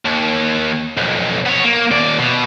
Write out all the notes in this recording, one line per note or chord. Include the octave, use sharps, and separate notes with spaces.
D#2
B1 F2
B3 C#5
A#3
D#2 D5
B2